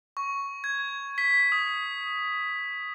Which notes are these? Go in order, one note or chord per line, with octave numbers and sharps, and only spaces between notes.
C#6
G#6
B6
D#6